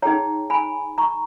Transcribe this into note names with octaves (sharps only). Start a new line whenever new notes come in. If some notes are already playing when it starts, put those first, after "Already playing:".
D#4 G#4 C#5 G5 A#5
G#5 B5
A#5 C#6